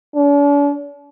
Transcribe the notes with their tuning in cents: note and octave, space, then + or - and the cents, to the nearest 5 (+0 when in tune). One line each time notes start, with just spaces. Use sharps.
D4 -45